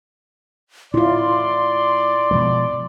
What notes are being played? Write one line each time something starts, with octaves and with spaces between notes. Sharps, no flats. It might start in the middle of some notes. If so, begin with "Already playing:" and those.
A2 E4 F4 D5 C6
B2 F3 G#3